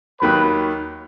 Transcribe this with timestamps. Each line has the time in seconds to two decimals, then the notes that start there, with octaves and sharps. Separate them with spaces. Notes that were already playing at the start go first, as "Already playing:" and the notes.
0.21 D#2 D#3 F#3 B4